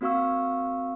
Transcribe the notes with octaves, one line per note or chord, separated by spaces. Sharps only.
A#3 C4 F#4 F5 C#6 E6